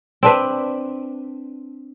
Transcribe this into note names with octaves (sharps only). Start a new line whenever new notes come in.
C4 D4 B4